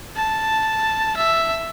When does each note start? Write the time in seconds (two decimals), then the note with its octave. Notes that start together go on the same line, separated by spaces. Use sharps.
0.16 A5
1.17 E5